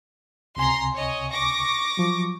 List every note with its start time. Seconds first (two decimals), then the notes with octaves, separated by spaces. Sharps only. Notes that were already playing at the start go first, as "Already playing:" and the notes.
0.57 C#2 C3 G#5 A#5 C6
0.93 C#5 D#5
1.29 C#6 D6 A#6
1.97 F3 F#3